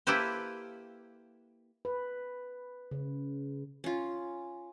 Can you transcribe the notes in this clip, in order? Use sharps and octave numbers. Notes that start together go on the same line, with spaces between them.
A#3 E4 G4 A4 B4 C5
B4
C#3
C#4 F4